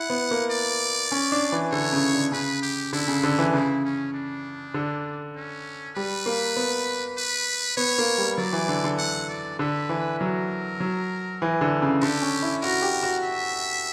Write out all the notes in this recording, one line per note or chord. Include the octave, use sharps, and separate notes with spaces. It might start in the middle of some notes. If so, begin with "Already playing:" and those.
Already playing: E4 F#5
B3
A#3
D5
C#4
D4
E3
D3 C#5
C#3
D3
C#3 B4
G4
D3 E4
C#3
D3
E3
C#3 E4
C#4
D4
D3
C#4
G3 B4
A#3
B3
B4
B3 C#5
A#3
G3
F#3 D5
E3
D3
D3
F#5
D5
D3 B4
E3
F#3 A#4
F#3
E3
D3
C#3
D3 G4
C#4
E4
F#4 A#4
G4
F#4
E5